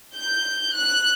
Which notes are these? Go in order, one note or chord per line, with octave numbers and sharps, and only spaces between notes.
G6
F#6